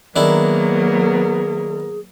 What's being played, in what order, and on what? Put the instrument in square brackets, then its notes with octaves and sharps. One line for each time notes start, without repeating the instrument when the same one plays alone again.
[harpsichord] D#3 D4 E4 [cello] F#3 A#3 [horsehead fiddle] B3 A#4 [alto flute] G#4